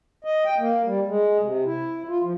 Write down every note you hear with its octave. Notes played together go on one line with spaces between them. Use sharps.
D#5
G5
A#3
G3
G#3
C3
E4
F4
F3